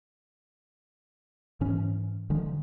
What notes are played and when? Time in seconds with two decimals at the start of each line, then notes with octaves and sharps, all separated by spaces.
1.61 G#2 E3 C#4
2.30 D3 D#3 F3 G#3